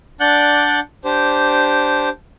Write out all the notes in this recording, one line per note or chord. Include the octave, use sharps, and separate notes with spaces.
D4 D5 F#5 F#6 G6
D4 G4 C5